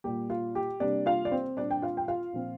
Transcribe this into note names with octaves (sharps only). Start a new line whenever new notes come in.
A#2 G3 A#3 G4
F4
G4
C3 G3 A#3 D4 D5
F4 F5
D5
C4 C5
A#2 G3 C4 D4 D5
G5
F4 F5
G5
F4 F5
A#2 F3 C4